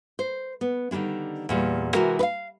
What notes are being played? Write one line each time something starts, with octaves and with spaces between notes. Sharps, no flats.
C5
B3
D3 D#3 G3 G#3 D4
E2 A#2 G3
C3 E3 G#3 F#4 A#4
B4 F5